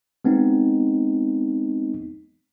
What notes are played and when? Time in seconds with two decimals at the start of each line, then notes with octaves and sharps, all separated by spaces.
0.25 G#3 B3 C4 D#4